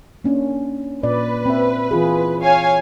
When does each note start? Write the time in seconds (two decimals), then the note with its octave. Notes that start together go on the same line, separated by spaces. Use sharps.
0.24 A#3 C#4 D4
1.03 A#2 B4 D5
1.46 C4 E5
1.91 E3 F4 G#4
2.42 C#5 F5 G#5